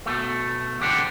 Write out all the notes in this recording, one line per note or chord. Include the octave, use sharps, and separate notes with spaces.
B2 A3
B1 E2 D3 G4 C5 F#5